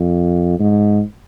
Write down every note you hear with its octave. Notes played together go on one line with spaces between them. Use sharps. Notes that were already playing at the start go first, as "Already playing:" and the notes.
Already playing: F2
G#2